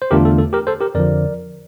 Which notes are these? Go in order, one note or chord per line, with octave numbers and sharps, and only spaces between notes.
C5
E2 D3 A3 D4 F4 G4 A#4
A4
A4
G4 A#4
A4 C5
G4 A#4
F2 D3 F3 A#4 D5